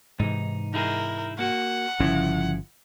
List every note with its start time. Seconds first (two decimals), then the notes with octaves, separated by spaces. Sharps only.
0.19 G#2 C3 E3 D#4
0.74 D#4 E4 G#4 A#4
1.39 A#3 F#4 F#5
2.00 G1 C#3 F3 C#4 E4